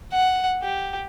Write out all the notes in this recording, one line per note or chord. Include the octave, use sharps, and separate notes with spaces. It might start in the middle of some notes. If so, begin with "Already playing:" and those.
F#5
G4